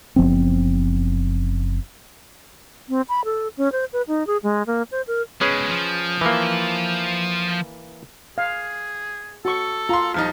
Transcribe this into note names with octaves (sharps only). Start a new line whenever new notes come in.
F#1 F3 B3 C4
C4
B5
A4
C#4
C5
B4
D#4
G#4
G#3
A#3
C5
A#4
B2 G#3 C#4 G#4 B4
F3
E3 A#3
G#4 F5
F#4 A4 C#6
F4 A#5 C6
D#1 F3 D#4 F5